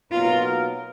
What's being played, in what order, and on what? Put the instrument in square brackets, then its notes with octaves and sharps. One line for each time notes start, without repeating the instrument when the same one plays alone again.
[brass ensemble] B2 F#3 A#3 D#4 A#4 [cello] F4